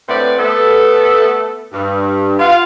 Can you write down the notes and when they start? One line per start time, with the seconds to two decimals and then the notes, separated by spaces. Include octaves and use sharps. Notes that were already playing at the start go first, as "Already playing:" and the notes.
0.09 A2 C4 B4 C5 D5 F#5
0.38 A3 B3 A4
1.73 G2
2.39 F4 F5 F#5